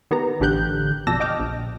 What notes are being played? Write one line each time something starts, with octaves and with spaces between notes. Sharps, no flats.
D#3 B3 G4 A#5
A1 D3 G4 F#6 G6
F2 B2 D5 A5 E6 A#6
D#5 G5 D6 F6
A#1